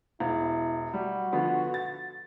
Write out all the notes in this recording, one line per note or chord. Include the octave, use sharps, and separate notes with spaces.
E1 E4
G3 F#4
D3 F3 B3
A6